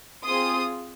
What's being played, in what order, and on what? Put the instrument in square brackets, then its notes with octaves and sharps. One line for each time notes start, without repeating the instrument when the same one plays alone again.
[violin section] C4 F4 G#4 C6 D#6